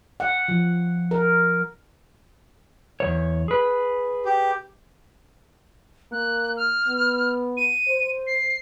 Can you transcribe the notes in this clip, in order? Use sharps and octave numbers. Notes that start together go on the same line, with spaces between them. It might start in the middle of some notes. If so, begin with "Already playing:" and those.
F#5
F3
A#4
E2 C#5
G#4 B4
G4
A#3 F#6
F6
B3
D#7
C5
C7